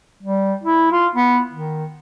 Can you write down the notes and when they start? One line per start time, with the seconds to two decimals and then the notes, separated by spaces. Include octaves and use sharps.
0.23 G3
0.64 E4
0.92 F4
1.16 B3
1.52 D#3